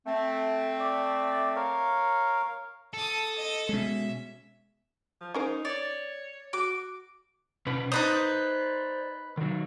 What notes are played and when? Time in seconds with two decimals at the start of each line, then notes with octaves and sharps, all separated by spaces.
0.07 A3 C4
0.80 D5
1.56 A#4 C#5 F5
2.93 A4 A5 D#6
3.35 D#5
3.69 B2 G#3 C#4 E5
5.21 F3
5.34 C#4 D#4 A#4 C5
5.65 C#5 D5
6.53 F#4 D6
7.66 B2 C#4 B4
7.92 D#4 B4 C5 D5 D#6
9.37 D#3 F#3